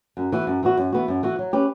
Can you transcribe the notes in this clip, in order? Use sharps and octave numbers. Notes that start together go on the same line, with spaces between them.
F#2
E3 B3 F#4
F#2
E3 B3 F#4
F#2
E3 B3 F#4
F#2
E3 B3 F#4
F#3
C#4 G4 B4